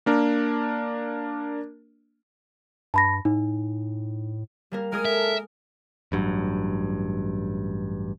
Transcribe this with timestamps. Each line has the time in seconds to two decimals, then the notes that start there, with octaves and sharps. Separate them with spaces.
0.06 A#3 D4 A#4
2.94 G2 A5 B5 A#6
3.25 A2 D#4
4.72 G3 A#3 A#4
4.92 G#3 G#4 A#4 D#6
5.05 A4 E5
6.12 A1 G2 F#3